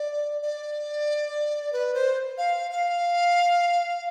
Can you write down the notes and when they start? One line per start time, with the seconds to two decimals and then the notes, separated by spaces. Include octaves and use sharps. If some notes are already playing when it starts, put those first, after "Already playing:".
Already playing: D5
0.42 D5
1.73 B4
1.94 C5
2.38 F5
2.71 F5